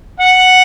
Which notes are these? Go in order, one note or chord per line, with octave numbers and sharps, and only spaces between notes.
F#5